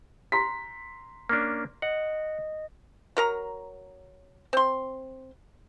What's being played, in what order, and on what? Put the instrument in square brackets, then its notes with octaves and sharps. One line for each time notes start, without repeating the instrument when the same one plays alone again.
[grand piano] A#5 C6 B6
[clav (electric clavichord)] A#3 C#4 D4
[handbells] D#5 [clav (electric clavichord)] F#5
[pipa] F#3 A#4 A#5
C4 C6